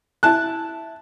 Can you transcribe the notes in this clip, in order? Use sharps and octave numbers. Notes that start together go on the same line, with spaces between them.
E4 A5 F#6